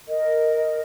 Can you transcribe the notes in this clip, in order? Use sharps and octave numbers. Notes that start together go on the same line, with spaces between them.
A#4 D#5